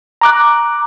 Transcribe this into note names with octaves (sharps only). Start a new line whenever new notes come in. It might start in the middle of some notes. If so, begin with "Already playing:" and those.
A#5 D6 F#6